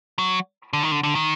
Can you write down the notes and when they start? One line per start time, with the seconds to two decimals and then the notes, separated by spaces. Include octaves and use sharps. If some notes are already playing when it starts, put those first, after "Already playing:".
0.19 F#3
0.73 D3
0.83 D#3
0.92 D3
1.03 D3
1.15 D#3